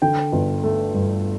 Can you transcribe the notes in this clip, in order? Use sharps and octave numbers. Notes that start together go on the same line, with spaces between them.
D3 G5
G1
A3
G2